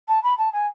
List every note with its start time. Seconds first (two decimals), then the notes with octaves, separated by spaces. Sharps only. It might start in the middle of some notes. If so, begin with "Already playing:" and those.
0.08 A5
0.23 B5
0.38 A5
0.53 G#5